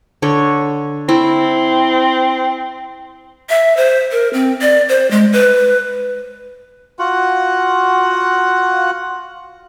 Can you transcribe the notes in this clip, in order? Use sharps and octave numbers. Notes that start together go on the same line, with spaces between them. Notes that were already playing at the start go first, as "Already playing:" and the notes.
D3 C#5
C4 E4
E5
C5
A#4
C4
D5
C5
G#3
B4
F4 F#4 F#5